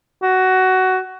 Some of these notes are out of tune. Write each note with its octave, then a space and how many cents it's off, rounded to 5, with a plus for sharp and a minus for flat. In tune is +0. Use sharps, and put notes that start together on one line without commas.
F#4 +15